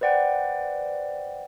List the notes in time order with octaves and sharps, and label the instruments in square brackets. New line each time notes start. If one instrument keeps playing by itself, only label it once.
[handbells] B4 C5 D5 F#5 G5